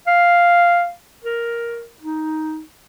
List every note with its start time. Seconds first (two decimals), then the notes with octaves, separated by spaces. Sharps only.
0.07 F5
1.24 A#4
2.02 D#4